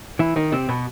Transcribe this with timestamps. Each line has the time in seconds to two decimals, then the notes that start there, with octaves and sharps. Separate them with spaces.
0.19 E3 E4
0.36 D#3 D#4
0.52 C3 C4
0.69 B2 B3